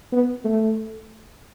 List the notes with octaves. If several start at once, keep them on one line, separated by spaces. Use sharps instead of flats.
B3
A3